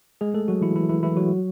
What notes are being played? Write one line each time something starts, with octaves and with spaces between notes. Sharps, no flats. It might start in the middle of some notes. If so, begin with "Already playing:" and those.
G#3 G#4
A3 A4
F#3 F#4
E3 E4
E3 E4
E3 E4
E3 E4
F#3 F#4